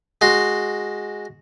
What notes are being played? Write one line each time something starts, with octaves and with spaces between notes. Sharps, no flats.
G#3 F#4 C6